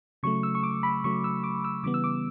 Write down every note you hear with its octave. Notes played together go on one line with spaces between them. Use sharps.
C#3 F#3 A3 C#6
E6
C#6
D6
B5
C#3 F#3 A3 C#6
E6
D6
E6
C#3 E3 G3 B3 D6
E6
D6